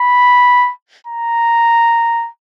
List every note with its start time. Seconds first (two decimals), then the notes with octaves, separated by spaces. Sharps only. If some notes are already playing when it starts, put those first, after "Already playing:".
Already playing: B5
1.07 A#5